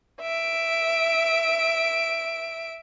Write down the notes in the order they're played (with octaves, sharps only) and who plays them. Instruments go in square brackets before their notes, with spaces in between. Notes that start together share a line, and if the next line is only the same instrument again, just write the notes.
[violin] E5 D7